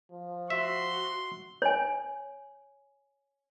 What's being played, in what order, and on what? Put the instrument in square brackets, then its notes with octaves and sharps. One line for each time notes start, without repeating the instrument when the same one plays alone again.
[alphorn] F3
[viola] F#4 [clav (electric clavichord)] E5 [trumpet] C6
[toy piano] C#5 G#5